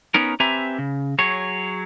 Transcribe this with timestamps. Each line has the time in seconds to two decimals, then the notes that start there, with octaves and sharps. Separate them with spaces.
0.14 B3 C#4 D#4 A#4
0.40 C4 G4 B4 E5 G#5 A#5
0.78 C#3
1.19 F#3 G#4 C#5